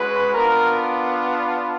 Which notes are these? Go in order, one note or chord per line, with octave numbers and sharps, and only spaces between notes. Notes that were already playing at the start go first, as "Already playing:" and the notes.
Already playing: G#3 C#4 F#4 B4
B3 D4 F4 A#4